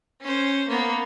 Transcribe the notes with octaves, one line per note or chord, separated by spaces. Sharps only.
C#4 C5
A#3 B3